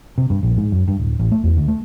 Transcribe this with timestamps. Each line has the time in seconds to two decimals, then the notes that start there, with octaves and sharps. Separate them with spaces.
0.18 C3
0.30 G2
0.43 A#1
0.57 G#2
0.72 F#2
0.88 G2
0.99 D1
1.19 A1
1.32 A3
1.44 E2
1.57 D2
1.68 A3